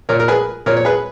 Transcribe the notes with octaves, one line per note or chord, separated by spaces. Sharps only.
A#2 A#4 C#5
A#4
G#4 B4
A#2 A#4 C#5
C#5
G#4 B4